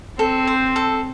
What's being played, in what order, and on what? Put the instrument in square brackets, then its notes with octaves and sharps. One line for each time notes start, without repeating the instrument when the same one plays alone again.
[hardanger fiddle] C4 [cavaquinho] A4
[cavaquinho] C5
A4